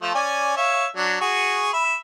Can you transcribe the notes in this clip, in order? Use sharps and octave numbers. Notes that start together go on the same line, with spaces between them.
F3 A3
C#4 D5 G#5
C#5 E5 F5
F#3 D4
F#4 G#4 C#6
E5 B5